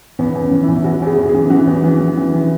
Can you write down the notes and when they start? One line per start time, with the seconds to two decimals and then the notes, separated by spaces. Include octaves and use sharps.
0.19 E2 B3
0.35 E2
0.40 C#4
0.51 E3
0.63 E4
0.68 E2
0.84 E2 F#4
1.02 E2 G#4
1.18 E2
1.29 G#4
1.35 E3
1.50 E3 F#4
1.67 E2
1.84 E3
2.00 E3
2.17 E3
2.34 E3